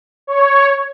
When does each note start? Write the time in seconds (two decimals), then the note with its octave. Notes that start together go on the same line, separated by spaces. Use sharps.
0.27 C#5